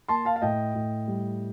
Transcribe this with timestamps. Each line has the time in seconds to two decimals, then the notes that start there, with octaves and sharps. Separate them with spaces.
0.08 A#3 A5 C6
0.25 F5 A5
0.36 F5
0.42 A2 D#5 G5
0.75 A2
1.08 G3